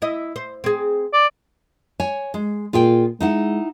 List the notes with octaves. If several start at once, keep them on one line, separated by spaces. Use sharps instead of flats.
E4 D#5
C5
C4 G#4
D5
C#5 G#5
G#3
A#2 F4 G#4 G5
G#3 D#4 E4 F#5